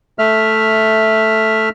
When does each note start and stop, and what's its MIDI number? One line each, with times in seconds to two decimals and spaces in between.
0.19 1.69 57
0.19 1.69 76
0.19 1.69 89